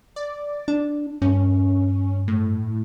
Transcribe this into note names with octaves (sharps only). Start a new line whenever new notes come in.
D5
D4
G2 C#4
A2